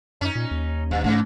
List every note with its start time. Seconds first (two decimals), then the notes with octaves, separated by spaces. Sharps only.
0.21 F#2 C#4 D#4
0.35 A#2
0.51 D#2
0.91 G2 D#3
1.04 G#2 C#3 E3 A3